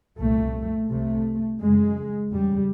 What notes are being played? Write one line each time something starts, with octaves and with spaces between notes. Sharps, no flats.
C2 A#2 A3
C2 C3 A3
F#2 C#3 G#3
E2 C#3 G3